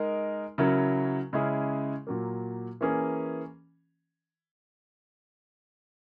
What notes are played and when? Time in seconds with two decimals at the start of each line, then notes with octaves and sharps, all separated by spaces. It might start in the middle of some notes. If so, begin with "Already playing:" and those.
Already playing: G#3 D#4 A#4
0.58 C#3 F#3 C#4 E4 A#4
1.33 C#3 G#3 C#4 E4 G#4
2.07 A#2 F#3 A#3
2.81 E3 A#3 C#4 G#4